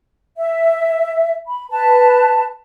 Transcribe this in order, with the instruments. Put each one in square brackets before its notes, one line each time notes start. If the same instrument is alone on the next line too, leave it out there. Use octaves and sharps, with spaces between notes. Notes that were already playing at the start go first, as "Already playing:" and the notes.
[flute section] E5
B5
B4 A5